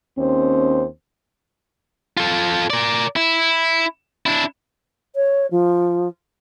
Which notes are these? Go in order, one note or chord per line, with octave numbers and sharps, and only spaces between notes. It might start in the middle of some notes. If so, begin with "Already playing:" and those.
D#2 C4 C#4 C5
F4 A4
A#4 D5
E4
D4 E4
C#5
F3